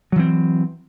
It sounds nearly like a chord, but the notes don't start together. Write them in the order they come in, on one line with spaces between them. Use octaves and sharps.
F#3 E3 C4